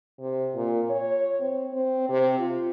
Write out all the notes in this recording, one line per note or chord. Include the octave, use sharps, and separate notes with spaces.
C3
A#2
C#5
C4
C4
C3
F4